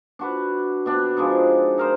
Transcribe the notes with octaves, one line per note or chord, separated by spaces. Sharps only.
D4 F#4 B4
B2 D4 G5
F3 G#3 D4 D#4
D#4 A#4 C5